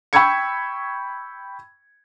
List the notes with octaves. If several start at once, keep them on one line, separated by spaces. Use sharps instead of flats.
G5 B5 C#6 E6 G#6 C#7